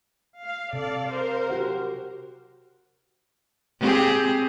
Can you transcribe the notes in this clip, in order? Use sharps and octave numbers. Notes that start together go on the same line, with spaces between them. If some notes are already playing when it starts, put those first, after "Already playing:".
F5
C3 A4 D5 F5
A#4 C5
F#4 G4 F#5
C4 G4 G#4